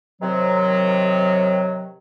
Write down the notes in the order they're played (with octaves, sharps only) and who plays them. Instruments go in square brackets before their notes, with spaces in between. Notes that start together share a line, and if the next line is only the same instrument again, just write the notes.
[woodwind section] C3 D#3 F#3